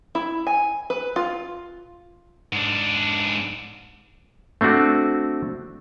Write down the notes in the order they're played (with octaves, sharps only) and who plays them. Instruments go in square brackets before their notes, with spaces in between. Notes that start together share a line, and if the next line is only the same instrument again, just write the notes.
[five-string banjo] E4
G#5
B4
F4
[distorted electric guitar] G#2 D4
[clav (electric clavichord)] A3 C4 D4 F#4